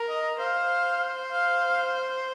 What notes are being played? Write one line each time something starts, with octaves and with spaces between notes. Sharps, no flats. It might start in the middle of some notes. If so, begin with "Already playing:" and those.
Already playing: A#4
D#5
C5 F5
F5